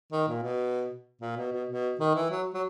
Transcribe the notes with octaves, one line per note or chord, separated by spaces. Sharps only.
D#3
A#2
B2
A#2
B2
B2
B2
D#3
E3
F#3
F#3